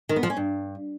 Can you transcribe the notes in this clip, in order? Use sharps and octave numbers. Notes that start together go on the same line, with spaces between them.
D#3
B3
F3
C#4
G2